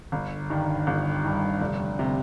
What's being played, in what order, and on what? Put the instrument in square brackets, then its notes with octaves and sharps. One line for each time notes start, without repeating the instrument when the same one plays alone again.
[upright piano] G1 [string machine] D3
[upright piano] G2 D#3
[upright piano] G1 [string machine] G3
[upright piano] G2 D#3
F1
C3